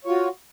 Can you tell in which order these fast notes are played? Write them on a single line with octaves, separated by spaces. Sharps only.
C#5 F4 F#4